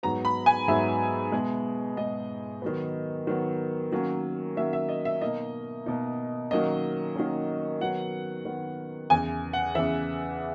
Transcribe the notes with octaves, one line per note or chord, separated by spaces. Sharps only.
G#2 F#3 B3 A#5
B5
G#5
G#2 F#3 B3 E5
B2 G#3 B3
B2 G#3 B3 D#5
D#3 F#3 B3
D#3 F#3 B3
D#3 F#3 A#3 C#4
D#3 F#3 A#3 C#4 E5
E5
D#5
E5
B2 A#3 D#4 D#5
B2 A#3 D#4
D#3 F#3 A#3 C#4 D#5
D#3 F#3 A#3 C#4
D#3 F#3 B3 F#5
D#3 F#3 B3
E2 C#3 E3 G#5
F#5
E2 C#3 E3 E5